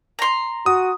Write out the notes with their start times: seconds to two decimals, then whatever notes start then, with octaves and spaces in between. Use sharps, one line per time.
0.19 A#5 C6
0.66 F#4 D#6